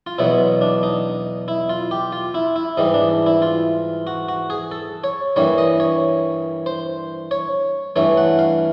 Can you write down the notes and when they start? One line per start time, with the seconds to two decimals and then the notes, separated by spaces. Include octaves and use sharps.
0.07 F4
0.18 E2 B2 F#3 B3 E4
0.61 D4
0.83 D#4
1.48 E4
1.69 F4
1.91 G4
2.12 F4
2.34 E4
2.56 E4
2.77 G#2 E3 G3 D#4
2.94 D4
3.26 E4
3.42 F4
4.07 F#4
4.29 F#4
4.50 G#4
4.71 A4
5.04 C#5
5.36 G2 E3 G3 A#3 C#5
5.58 D#5
5.80 C#5
6.66 C5
7.31 C#5
7.96 G2 E3 A3 C#5
8.17 F#5
8.39 F5